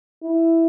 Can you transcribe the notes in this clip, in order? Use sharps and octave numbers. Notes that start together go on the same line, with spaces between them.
E4